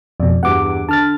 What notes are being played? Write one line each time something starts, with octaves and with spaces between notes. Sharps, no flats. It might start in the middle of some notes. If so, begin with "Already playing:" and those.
F2 B2 D5
E2 G2 F#5 D6
D3 A5 F6 A6